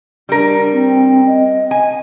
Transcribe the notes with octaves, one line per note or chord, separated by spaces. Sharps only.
G3 D4 A#4
C4
D#5
G#5